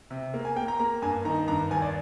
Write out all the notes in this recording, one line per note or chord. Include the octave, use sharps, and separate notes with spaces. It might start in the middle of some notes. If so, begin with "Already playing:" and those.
C3
A#3
G#5
A#3 G5
A#5
A#3 A#5
G2 G#5
D#3 A#5
G2 A#5
D#2 G#5
D5